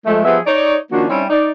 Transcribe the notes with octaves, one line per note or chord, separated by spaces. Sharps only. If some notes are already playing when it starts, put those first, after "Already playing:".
F3 G#3 A3
F3 G3 B3 G#4 E5
D#4 C#5 D5
D#3 F3 A#3 C#4 D4 F#4
G3 C4 C#4 D#4 E4
D#4 D5